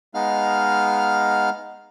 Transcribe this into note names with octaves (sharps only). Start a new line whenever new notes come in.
G#3 B3 D#4 F5 F6